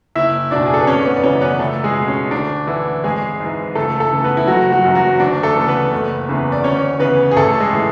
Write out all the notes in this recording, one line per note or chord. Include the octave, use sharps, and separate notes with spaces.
F#1 E4 E5
E2 B2 D4 D5
G#4
A4
B4
G#1 C#4 C#5
B3 B4
D5
F#2 C#3 E3 C#4 C#5
B3 B4
C#2 A3 A4
G#3 G#4
B2
C#4
D2 D4
D3 E3 E4
G#1 G#3 G#4
G#2 E3
C#2 A3 A4
A3 A4
C#3 E3
B3 B4
E4
F#1 F#3 F#4
F#3 F#4
F#2 E3
F#3 F#4
D2 D4
A3 A4
C#3 E3
B3 B4
F#1
E2 C#3 E3
D5
D2 C#4 C#5
C#3 E3 B3 B4
G#4
A1 A3 A4
G#3 G#4
A2 E3